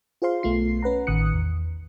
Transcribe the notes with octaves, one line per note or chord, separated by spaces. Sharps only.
F4 G#4 C5 F5 C6
B1 A3 B3 F4 C7
C#4 B4 F#5 A#5
A1 D#3 D#6 F#6 C#7
E2